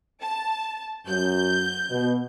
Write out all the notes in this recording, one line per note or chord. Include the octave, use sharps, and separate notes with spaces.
A5
F#2 F#3 G6
B2